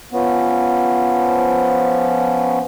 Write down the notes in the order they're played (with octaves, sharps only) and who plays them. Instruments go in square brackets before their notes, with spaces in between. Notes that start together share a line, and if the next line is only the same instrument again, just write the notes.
[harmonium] F3 B3 C#4